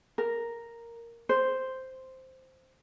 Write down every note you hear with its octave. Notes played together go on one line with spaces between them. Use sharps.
A#4
C5